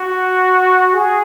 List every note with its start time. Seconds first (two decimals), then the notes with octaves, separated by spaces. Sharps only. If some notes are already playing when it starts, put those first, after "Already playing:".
Already playing: F#4
0.94 G#4